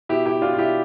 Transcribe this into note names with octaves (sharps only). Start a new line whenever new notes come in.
B2 E4 G4
E4 G4
B2 D4 F4
F4
E4 G4